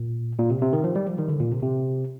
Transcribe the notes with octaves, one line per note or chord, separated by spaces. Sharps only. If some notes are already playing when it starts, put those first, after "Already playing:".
Already playing: A#2
A#2
C3
C3
D#3
F3
G3
F3
D#3
D3
A#2
C3
C3